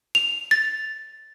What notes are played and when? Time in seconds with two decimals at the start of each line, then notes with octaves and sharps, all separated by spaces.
0.15 F7
0.51 A6